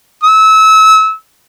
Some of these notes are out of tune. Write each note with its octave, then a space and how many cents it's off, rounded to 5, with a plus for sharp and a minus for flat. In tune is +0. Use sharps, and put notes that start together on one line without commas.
E6 -30